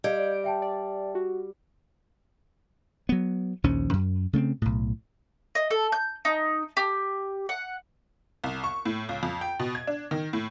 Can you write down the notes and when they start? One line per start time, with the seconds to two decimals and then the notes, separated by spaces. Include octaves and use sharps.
0.04 G3 D#5 F5 G6 G#6 D7
0.44 E5 G5 A5
0.62 D5
1.15 F#4
3.09 F#3 B3
3.64 A#1 D#2 F3 C#4
3.93 F#2
4.33 C#3 A3 B3 C4
4.62 B1 A2
5.55 D#5
5.70 A4
5.92 G6
6.25 D#4
6.77 G4
7.49 F#5
8.44 C2
8.64 C#6
8.86 A2
9.09 C#2
9.23 F2
9.41 G5
9.60 B2
9.75 G#6
9.87 D4
10.11 D#3
10.33 A2